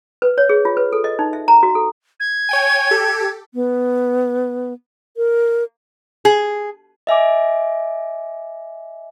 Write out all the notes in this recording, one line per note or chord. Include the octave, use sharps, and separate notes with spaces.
B4
C#5
G#4
F4
B4
A4
D#5
D#4
E5
A#5
F#4
A4
G#6
C#5 G5 G#5
G4 A4
B3
A#4
G#4
D#5 E5 G#5 D6